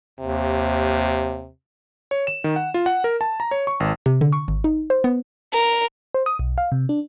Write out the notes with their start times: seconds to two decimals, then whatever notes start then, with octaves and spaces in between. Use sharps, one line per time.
0.20 D#2 C3
2.11 C#5
2.27 E7
2.44 D#3
2.56 F#5
2.74 F4
2.86 F#5
3.04 A#4
3.21 A5
3.40 A#5
3.51 C#5
3.67 C#6
3.80 G#1
4.06 C3
4.21 D3
4.32 C#6
4.48 G#1
4.64 D#4
4.90 C5
5.04 B3
5.53 A#4
6.14 C5
6.26 D#6
6.39 B1
6.58 F5
6.72 C3
6.89 D4